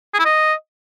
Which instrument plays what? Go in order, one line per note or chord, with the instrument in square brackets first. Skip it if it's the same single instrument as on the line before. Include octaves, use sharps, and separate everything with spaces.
[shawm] G#4
E4
D#5